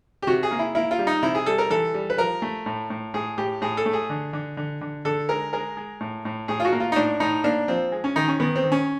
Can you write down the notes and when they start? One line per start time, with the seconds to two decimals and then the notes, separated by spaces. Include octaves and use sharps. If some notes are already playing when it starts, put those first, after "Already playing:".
0.22 G4
0.27 C3 F#4
0.43 G#4
0.51 A#3
0.59 E4
0.75 A#3 E4
0.91 F4
0.99 G3
1.07 D#4
1.23 C3 E4
1.35 G#4
1.46 G3 A4
1.58 A#4
1.70 E3 A4
1.94 G3
2.10 B4
2.18 F3 A#4
2.42 A3
2.66 A2
2.90 A2
3.14 A2 G#4
3.38 A2 G4
3.61 A2 G#4
3.77 A4
3.86 A3
3.93 G#4
4.10 D3
4.33 D3
4.57 D3
4.81 D3
5.05 D3 A4
5.29 G#3 A#4
5.53 G#3 A#4
5.77 G#3
6.00 A2
6.25 A2
6.48 A2 G#4
6.60 F4
6.65 F#4
6.72 A#3
6.80 F4
6.92 D#4
6.96 A2 D4
7.20 A2 D#4
7.44 A#3 D4
7.68 F3 C4
7.92 G#3
8.04 C#4
8.16 D#3 D#4
8.28 C#4
8.40 D#3 B3
8.56 C4
8.64 D#3
8.72 C#4